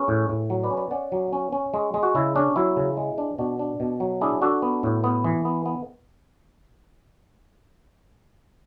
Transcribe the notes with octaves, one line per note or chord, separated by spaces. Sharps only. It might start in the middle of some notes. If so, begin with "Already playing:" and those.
Already playing: C#4 G#4 B4
A2
A2
F#3
B4 D5
C#4
B4 D5
C#4 D5 F#5
F#3
C#4
C#4
G#3
G#3
F#4
C#3 E4
C#4 D4
F#3 E4
C#3
G#3
D4
B2 D4 F#4
D4
B2
F#3
D4 E4 G#4
D4 F#4 A4
B3
A2
B3
E3
B3
B3